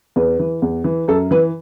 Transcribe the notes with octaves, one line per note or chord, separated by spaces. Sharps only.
E2 B4
E3
E2
E3
F#2 A4
E3 B4